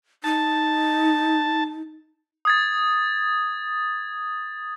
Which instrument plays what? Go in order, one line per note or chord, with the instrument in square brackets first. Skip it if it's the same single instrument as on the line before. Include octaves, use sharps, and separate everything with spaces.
[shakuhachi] D#4 [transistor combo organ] A5
[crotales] D#6 G#6 A6